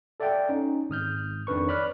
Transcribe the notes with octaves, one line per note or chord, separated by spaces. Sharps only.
A4 D5 E5 F#5 G5
C#4 D#4
G#1 D#6 F6 G6
F2 D#3 D4 B4 C#6
C#5 D5 B5 D6 F6 F#6